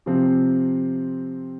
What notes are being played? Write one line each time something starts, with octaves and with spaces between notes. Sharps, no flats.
C3 F3 C4